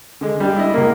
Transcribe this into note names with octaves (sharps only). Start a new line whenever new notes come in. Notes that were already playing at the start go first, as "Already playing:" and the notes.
D3 G#3
G3 D4
E4 D#5
C#2 C#3 A#3